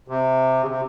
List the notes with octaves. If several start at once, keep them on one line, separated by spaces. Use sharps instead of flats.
C3
C#3
C3